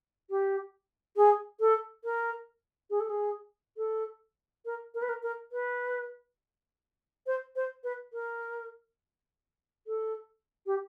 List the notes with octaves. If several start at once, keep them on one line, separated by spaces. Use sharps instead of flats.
G4
G#4
A4
A#4
G#4
A4
G#4
A4
A#4
A#4
B4
A#4
A#4
B4
C5
C5
B4
A#4
A4
G4